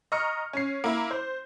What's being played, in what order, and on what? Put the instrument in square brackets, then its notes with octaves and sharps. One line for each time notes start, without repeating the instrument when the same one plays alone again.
[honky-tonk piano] D#5 A#5 C#6 F6 C#7
C#4 C7
A#3 E4
C5